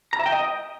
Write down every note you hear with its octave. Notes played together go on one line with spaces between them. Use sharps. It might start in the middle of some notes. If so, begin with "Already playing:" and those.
A#5
E5
G5
D#5